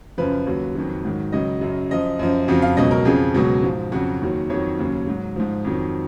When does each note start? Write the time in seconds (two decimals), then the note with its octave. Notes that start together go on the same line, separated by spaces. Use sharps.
0.18 F#2 C#3 F3 B4
0.46 D#2 C#3 F#3
0.75 F2 D#3 F#3
1.04 G#2 D#3 F#3
1.32 C#2 C#3 F#3 D#5
1.61 F#2 C#3 F#3
1.91 F#2 F3 D#5
2.19 F#2 F3
2.48 F2 C#3 F3 F#4
2.62 F5
2.77 C#2 B2 F#3 D#5
2.91 A#4
3.05 F2 C#3 F3 G#4
3.34 C#2 B2 F#3
3.63 G#2 F3
3.92 F2 C#3 F#3 F#4
4.21 D#2 D#3 F#3
4.50 F2 D#3 F#3 C#5
4.79 D#2 C#3 F#3
5.07 G#2 F#3
5.36 G#2 F3
5.65 F2 D#3 F#3